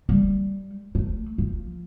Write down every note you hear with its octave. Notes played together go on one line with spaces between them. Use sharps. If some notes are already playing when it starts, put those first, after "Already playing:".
G3
A3
F3